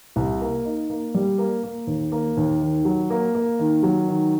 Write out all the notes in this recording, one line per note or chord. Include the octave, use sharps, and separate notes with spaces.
C2
A#3
D#4
A#3
G3
A#3
A#3
D#2
A#3
D#2
D#3
F#3
A#3
A#3
D#3
F#3
D#3